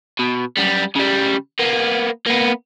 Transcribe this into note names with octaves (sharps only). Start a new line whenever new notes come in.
B2
F#2 G3
C#3 G3
A#3 B3
A#3 B3